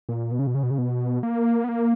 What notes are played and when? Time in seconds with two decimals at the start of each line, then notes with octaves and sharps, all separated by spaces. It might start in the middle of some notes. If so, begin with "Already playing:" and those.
0.09 A#2
0.32 B2
0.39 C#3
0.47 B2
0.55 C#3
0.63 B2
0.71 C#3
0.78 B2
1.23 A#3
1.64 B3
1.69 A#3